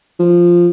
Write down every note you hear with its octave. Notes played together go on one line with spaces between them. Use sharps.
F3